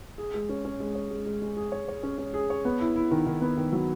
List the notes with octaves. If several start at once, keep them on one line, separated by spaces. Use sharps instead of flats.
G#4
G#3
C#4
C#4
G#3
C#5
G#3
G#3
G#3
G#4
C#5
C#5
C#4
C#4
G#4
C#5
B3
E4
E4
D#3
D#3
B3
D#3
F#3